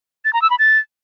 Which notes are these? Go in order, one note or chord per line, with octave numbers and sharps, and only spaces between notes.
A6
A#5
E6
B5
A6